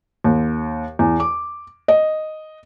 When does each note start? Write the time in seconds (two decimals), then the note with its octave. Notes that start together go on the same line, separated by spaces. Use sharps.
0.24 D#2
0.99 E2
1.20 D6
1.88 D#5